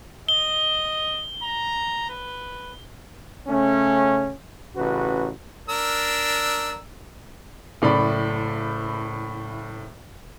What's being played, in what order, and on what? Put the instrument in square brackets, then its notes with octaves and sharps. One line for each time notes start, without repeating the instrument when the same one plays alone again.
[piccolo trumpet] D#5 [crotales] G7
[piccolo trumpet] A#5
B4
[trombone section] C#3 A3 C#4
A1 C#3 F#4 B4
[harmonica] D4 A#4 E6
[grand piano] F#1 A2 D5 B5